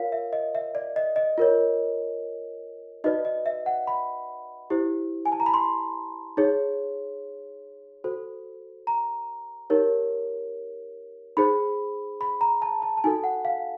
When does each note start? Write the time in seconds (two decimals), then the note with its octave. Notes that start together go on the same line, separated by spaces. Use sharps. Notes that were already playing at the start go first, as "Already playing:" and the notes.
Already playing: F4 A#4 C#5 F5
0.12 E5
0.33 D#5
0.55 E5
0.75 D5
0.96 D#5
1.16 D#5
1.38 F4 A#4 C#5
3.04 D#4 F#4 B4 D5 D#5
3.25 D#5
3.46 E5
3.66 F#5
3.87 B5
4.70 E4 G4 C5
5.26 G#5
5.32 A5
5.40 A#5
5.46 B5
5.54 C6
6.37 D#4 G#4 C#5
8.04 F#4 A4 C5
8.87 A#5
9.70 D#4 G4 A#4 C#5
11.37 D#4 G#4 C5 B5
12.21 B5
12.41 A#5
12.62 A5
12.82 A5
12.97 A5
13.04 D#4 F#4 A4 G#5
13.24 F#5
13.45 F5